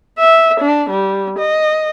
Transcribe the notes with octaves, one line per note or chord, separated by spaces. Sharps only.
E5
D4
G3
D#5